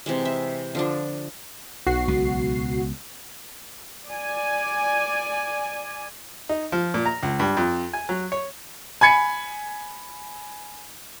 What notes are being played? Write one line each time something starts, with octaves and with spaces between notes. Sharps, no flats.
C3 E3 G#3
E5
D3 F3 D4
B1 F#4 C7
C#2 B3
D5 G#5
D#4
F3
A#2
A#5
C#2
G2
F2
G#5
F#3
C#5
G#5 B5 G#6 C#7